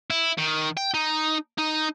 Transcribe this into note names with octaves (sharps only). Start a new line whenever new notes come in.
E4
D#3
G5
D#4
D#4